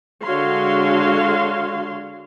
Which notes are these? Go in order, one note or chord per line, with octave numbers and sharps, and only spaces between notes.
D3 G#3 F#4 C#5 F5 C6